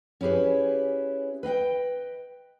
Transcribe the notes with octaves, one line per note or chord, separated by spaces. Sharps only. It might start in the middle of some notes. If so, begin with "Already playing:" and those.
C#4 E4 G4 G#4 B4
B4 D#5 F5 G5